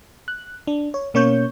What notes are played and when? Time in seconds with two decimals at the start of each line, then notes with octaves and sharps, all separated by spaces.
0.28 F#6
0.67 D4
0.94 C#5
1.14 B2 A#3 C#4 C#5 C#6 G6